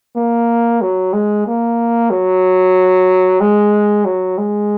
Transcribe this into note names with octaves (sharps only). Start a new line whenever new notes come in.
A#3
F#3
G#3
A#3
F#3
G#3
F#3
G#3